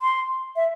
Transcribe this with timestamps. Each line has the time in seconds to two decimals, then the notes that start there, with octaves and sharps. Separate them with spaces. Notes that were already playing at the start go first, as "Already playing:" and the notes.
0.02 C6
0.56 E5